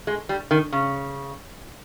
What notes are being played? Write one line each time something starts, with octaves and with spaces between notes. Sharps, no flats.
G#3
G3
D#3
C#3